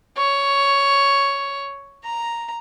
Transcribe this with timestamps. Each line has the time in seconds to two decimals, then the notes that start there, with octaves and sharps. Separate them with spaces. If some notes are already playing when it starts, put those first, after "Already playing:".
0.17 C#5
2.04 A#5